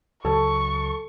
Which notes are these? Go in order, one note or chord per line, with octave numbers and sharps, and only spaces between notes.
C#2 C#3 F#3 A4 C#6